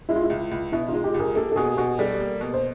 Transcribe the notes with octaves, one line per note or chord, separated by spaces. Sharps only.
G#3 E4
F4
E4
C#2
C#2
B2 E4
D#4 F4
G#3
F4 G4
C#2 G#4 A#4
A#3 G4 A4
A4
B2 F#4 G#4
G4
B2 F#4 G#4
G3 G4 A4
A#3
B2
C5